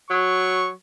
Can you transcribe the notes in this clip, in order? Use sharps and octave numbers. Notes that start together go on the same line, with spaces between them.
F#3 C#6